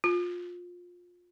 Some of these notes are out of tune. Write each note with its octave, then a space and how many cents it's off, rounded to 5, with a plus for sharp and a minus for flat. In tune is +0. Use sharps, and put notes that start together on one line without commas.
F4 +20